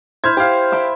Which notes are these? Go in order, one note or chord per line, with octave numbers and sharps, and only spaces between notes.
E4 C5 F6 G#6
G4 F5
E5 G5 B5